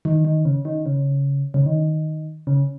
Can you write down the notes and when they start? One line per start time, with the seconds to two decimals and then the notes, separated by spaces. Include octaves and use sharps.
0.05 D#3
0.25 D#3
0.45 C#3
0.65 D#3
0.86 C#3
1.54 C#3
1.66 D#3
2.47 C#3